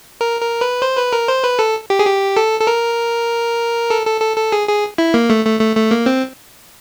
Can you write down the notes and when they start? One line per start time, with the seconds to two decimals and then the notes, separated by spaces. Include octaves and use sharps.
0.21 A#4
0.41 A#4
0.61 B4
0.82 C5
0.97 B4
1.13 A#4
1.28 C5
1.44 B4
1.59 A4
1.90 G4
1.99 G#4
2.06 G4
2.37 A4
2.60 A4
2.67 A#4
3.90 A4
4.06 A4
4.21 A4
4.37 A4
4.52 G#4
4.68 G#4
4.98 E4
5.14 A#3
5.30 A3
5.45 A3
5.60 A3
5.76 A3
5.91 A#3
6.06 C4